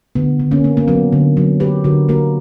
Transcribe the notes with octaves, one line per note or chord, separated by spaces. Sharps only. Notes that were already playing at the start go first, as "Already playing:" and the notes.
D3 B3
D3
A#3 C#4
A#3
A#3
F#3 B3
D3
F#3
A#3 G4 B4
D3 F#4 A#4
A#3 F#4 A#4